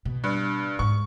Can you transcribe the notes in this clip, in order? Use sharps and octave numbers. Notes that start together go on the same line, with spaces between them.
B2
G2
G#2 C#6